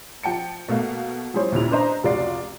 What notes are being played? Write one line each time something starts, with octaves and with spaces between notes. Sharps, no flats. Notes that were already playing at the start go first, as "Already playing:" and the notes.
F3 G5 A5 C#7
B2 A3 A#3 F5
F3 G3 E4 G#4 C5 C#5
D#2 A#2 C#3 E4 F7
D4 B4 C5 D#5 A#5
F1 C#2 F4 F#4 D5 C7